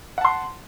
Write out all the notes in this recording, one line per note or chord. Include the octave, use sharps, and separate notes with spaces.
F#5 A5 C6